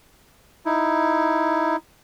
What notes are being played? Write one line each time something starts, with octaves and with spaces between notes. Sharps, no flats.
D#4 E4